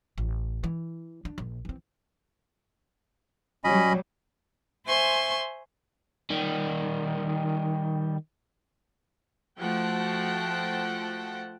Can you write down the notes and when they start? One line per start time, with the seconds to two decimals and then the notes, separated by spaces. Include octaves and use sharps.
0.18 A1
0.64 E3
1.25 D4
1.38 A#1
1.65 E3 C4
3.64 F#3 G3 C#4 D#5 B5
4.87 C5 E5 G#5 C6 C#6
6.30 D#3 G3
9.59 F3 A3 F#4 F#5 G5 A5